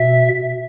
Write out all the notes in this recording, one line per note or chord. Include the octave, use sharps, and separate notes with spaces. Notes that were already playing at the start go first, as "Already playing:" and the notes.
Already playing: B2 E5